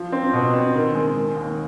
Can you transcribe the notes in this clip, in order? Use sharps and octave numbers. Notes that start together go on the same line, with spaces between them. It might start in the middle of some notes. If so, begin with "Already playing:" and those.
Already playing: F3
C4
B2
C4
D#3
G#3
D#3
D#2